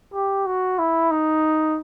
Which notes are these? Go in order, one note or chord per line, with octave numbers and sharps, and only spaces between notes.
G4
F#4
E4
D#4